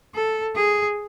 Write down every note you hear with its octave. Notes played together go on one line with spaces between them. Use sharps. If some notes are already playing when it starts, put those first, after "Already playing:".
A4
G#4